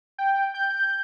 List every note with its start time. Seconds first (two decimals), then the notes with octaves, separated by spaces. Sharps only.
0.18 G5
0.54 G6